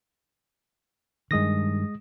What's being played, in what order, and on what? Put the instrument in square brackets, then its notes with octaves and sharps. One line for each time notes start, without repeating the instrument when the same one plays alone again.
[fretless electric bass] G2 D#3 [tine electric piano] G#3 D#6 A#6